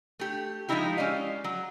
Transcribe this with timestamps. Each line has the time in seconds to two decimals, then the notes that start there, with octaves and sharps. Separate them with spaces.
0.19 A3 G4
0.69 F3 G#3 C#4 D#4 E4 G4
0.97 G#3 C#4 D5 D#5 F5
1.44 F#3